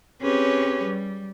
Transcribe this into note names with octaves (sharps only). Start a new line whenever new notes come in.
C4 C#4 G4 G#4 B4 C#5
G3